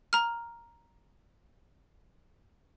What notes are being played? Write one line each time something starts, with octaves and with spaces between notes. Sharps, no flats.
A#5 F6